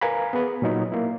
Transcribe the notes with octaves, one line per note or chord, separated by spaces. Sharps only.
A#4 B4 F5 G#5 A#5 B5
B3 G#4 B4
A#2 F#3 D#4
A#3 E4